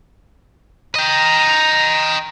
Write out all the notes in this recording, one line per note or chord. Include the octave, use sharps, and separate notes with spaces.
D#5 G5 A#5